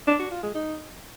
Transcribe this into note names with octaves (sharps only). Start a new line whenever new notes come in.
D4
F#4
F4
G#3
D#4